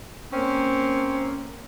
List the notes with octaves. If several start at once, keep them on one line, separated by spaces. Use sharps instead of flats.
A#3 C4 C#4